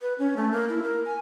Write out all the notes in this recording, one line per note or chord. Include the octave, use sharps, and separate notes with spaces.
B4
C#4
A3
A#3
E4
A#4
G#5